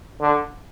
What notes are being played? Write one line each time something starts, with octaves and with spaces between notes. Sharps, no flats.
D3